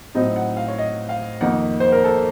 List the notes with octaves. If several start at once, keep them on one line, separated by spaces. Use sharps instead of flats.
A2 F#3 C4 D#4 D#5
F#5
F5
C#5
D#5
F5
F2 D#3 A#3 D#4 F#5
C5
A#4
A4